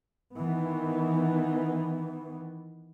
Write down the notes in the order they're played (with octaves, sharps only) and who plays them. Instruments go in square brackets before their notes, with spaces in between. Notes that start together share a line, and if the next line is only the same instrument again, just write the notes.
[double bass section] D#3 E3 B3